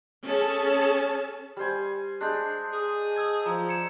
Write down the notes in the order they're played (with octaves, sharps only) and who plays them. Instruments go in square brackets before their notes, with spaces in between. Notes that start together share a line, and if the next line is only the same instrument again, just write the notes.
[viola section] C#4 G#4 A4 A5
[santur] G3 C5 G#5
[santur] G#3 D4 [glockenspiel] F#6 G6
[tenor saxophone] G#4
[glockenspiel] E6 G#6
[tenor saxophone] F3 [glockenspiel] A#5 G#6
[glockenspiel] G#6 C#7 E7